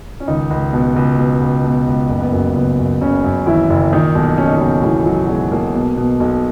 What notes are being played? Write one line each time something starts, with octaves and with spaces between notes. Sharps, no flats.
C#4
C#2 D#3 D#4
C#2
B2
C#2
B2
C#2
B2
C#2
F#1 A#3
B3
F#2 A#3
F#1 B3
F#2
F#1 C#3 C#4
F#2
D#3 E3 E4
F#1
A#2 D#3 D#4
B1
B1 C#4
D#4
B1 C#3 C#4
F#4
B1 E3 E4
A#2 F#3 F#4
F#4
B1 G#3 G#4
B1 A#3
B2
B2
B1